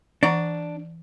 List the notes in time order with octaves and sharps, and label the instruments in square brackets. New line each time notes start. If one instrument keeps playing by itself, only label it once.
[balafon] E3 F#5 A#5 [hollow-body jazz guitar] D4